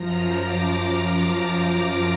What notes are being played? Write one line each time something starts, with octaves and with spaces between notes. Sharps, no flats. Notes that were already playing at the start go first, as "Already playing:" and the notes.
Already playing: F#2 F3 A#5
D6